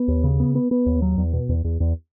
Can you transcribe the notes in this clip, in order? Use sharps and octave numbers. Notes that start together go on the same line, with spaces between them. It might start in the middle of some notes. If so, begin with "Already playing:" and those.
Already playing: B3
D#2
C#3
B3
B3
B3
D#2
F#3
E2
B2
E2
E2
E2